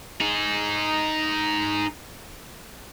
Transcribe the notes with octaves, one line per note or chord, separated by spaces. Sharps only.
D#4 G#4